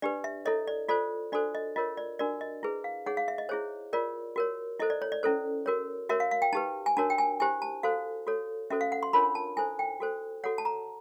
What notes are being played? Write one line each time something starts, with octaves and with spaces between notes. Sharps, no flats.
D4 G4 B4 D5
E5
E4 A4 C#5 D#5
D5
F4 A4 C5 D5
D4 F#4 A4 C5 D5
D#5
F4 A#4 C#5 D#5
D5
D4 F#4 A#4 D5
D#5
E4 G#4 B4
F5
D#4 G#4 C#5 F#5
F5
E5
D#5
E4 G#4 C5 C#5
F4 A#4 C#5 D5
F#4 A#4 C#5
E4 A4 C5 D#5
D5
C#5
D5
C#4 E4 A4 C5
F#4 A#4 C#5
F#4 A#4 C#5 E5
F5
F5
G5
D#4 G4 B4 A5
G#5
D4 F#4 A#4 C#5 A5
G5
G#5
E4 G4 C5 G#5
A5
F#4 A4 C5 F5
F#4 A4 C#5
C#4 F#4 A4 C5 E5
F5
F#5
C6
D4 F4 A#4 C#5 B5
A5
E4 A4 C5 G#5
G5
F#4 A4 C5
F#4 A4 C#5 F#5
A5
A#5